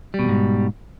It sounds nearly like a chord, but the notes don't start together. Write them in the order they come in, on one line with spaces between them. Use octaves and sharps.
G3 B2 E2 G#2